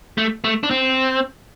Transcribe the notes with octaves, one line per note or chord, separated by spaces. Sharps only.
A3
A3
D4
C4